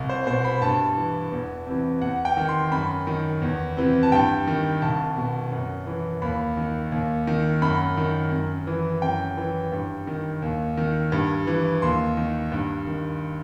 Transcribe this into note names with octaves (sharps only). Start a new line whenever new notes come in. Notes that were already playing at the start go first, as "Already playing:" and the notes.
Already playing: C2
C5
B2 C5
B5
G2 A5
E3
E2
C3 E3
E2 F#5
G5
D#3
C6
F#2 B5
D#3
E2
C3 E3
A5
G2 G5
D#3
C2 A5
B2
F#2
E3
D#2 B5
D#3
D#2
D#3
F#2 B5
D#3
F#2
E3
F#2 G5
E3
G2
D#3
D#2
D#3
G2
E3
D#2 C6
D#3
G2
D#3